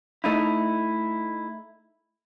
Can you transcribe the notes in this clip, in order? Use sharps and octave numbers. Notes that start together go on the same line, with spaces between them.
A3 D#4 E4